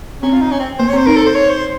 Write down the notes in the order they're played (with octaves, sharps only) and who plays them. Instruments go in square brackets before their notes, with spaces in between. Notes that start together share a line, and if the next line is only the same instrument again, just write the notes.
[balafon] C4 [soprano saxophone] C#4
[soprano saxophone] F4
D#4
C#4
C4
[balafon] A#3 [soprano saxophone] C5
[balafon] C4 [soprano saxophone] C#5
[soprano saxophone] C5
[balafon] D#4 [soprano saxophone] A#4
[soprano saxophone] A4
C5
C#5
C5